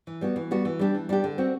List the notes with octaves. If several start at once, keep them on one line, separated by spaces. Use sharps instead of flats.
E3
G3 B3 F#4
E3
G3 B3 F#4
E3
G3 D4 G4
E3
G3 D4 G4
D3
G3 C4 F#4